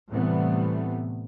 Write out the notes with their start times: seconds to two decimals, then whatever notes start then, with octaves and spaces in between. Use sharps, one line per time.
0.10 A2 C3 E3 G3 A3 B3